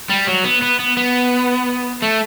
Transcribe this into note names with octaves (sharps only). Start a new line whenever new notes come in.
G3
F#3
B3
B3
B3
B3
A3